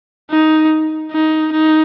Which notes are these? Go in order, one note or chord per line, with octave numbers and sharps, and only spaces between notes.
D#4
D#4
D#4